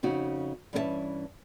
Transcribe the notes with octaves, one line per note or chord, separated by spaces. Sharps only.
F2 C#3 D#4 F#4
G2 E3 C#4 A#4 E5 A5